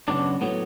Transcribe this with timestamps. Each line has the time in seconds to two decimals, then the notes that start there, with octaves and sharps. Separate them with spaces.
0.08 F#2 C#3 F#3 B3 D4
0.41 A2 F#3 B3